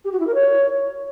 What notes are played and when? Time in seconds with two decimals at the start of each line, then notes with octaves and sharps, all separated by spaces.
0.05 G4
0.12 F#4
0.20 E4
0.27 A#4
0.35 C#5